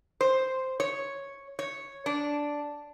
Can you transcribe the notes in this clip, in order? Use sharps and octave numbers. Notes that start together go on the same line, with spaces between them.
C5
C#5
C#5
D4